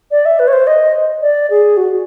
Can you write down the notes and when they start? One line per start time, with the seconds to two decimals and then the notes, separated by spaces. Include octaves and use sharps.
0.11 D5
0.26 E5
0.39 B4
0.48 C#5
0.53 C5
0.67 D#5
1.22 D5
1.50 G#4
1.77 F#4